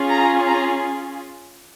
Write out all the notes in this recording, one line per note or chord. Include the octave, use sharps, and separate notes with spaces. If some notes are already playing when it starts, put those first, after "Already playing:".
Already playing: C#4 F4 G#4
A#5
A#5